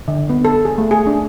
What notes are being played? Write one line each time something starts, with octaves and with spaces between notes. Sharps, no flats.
D3
B3
A4
G#4
A3
G#4
D4